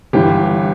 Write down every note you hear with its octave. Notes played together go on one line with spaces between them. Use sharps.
G1 G2 E3 G4